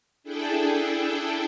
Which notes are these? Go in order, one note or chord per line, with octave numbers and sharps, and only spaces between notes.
D4 E4 G#4 A4 G5